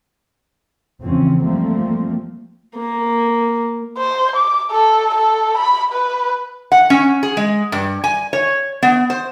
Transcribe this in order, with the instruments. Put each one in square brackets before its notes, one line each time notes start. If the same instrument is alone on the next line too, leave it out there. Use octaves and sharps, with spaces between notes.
[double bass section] E2 C#3 E3 F3 C4 C#4
F3 G3 A3 A#3 C4
[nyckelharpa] A#3
[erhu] C5
D6
A4
A4
B5
B4
[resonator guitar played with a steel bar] F#5
C#4
G#4
G#3
G2
G#5
C#5
B3
C5